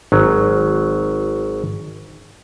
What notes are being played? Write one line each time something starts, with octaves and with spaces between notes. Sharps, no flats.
G#1 F#3